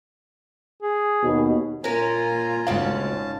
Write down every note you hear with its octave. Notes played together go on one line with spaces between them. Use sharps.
G#4
D#2 B2
A#2 C#4 F4 A#4 G#5 A#5
G#1 D2 C#3 C#4 F5 F#5 A5